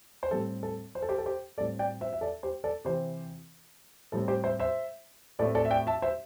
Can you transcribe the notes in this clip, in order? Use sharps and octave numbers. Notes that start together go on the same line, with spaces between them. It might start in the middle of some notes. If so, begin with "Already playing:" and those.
C5
A2 G3 C4 A4
A4
C5
A4
G4 C5
A4
G4 C5
A2 G3 C4 A4 D5
D5 G5
C5 E5
E5
A4 D5
G4 C5
A4 D5
C3 E3 C4 G4 C5
A2 G3 C4 A4
G4 C5
C5 E5
C5 E5
A2 A3 C4 A4 D5
A4 D5
E5
D5 G5
E5 A5
C5 E5